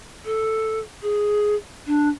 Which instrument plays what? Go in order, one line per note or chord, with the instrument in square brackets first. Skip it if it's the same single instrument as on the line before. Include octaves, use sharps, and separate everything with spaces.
[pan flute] A4
G#4
D4